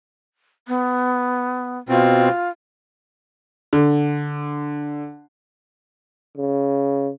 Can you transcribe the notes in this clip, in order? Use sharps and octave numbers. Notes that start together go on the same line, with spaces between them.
B3
B2 C4 F4
D3
C#3